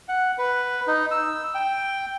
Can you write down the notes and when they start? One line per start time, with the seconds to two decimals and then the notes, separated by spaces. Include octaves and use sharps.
0.09 F#5
0.38 B4
0.87 D#4
1.11 E6
1.55 G5